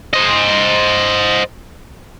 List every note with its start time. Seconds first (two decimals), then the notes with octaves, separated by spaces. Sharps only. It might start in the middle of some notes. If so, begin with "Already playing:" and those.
0.14 C5 D#5